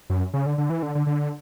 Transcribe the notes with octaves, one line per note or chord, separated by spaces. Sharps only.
F#2
C#3
D3
D3
E3
D3
D3
D3